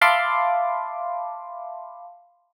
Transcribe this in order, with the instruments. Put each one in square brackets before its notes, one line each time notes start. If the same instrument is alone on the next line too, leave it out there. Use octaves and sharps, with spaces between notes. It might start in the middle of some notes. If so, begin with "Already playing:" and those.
[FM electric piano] E5 F5 A5 B5 C6 D6